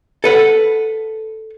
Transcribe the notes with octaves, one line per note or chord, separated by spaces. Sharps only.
A4 B4 F#5